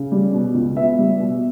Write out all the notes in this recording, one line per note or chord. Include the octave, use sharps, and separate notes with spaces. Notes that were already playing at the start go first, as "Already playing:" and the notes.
Already playing: C#3
G3
B2
C#2
B3 E5
G3
B2